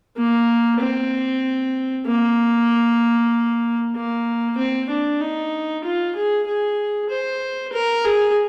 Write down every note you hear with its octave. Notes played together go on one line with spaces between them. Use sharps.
A#3
C4
A#3
A#3
C4
D4
D#4
F4
G#4
G#4
C5
A#4
G#4